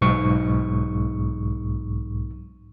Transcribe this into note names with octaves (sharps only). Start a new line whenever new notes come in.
B1 G#2 C#6